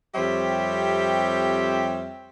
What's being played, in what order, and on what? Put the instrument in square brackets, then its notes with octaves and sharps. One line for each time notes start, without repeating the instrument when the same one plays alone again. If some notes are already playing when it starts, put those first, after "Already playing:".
[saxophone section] F2 G3 C4 G4 C#5 E5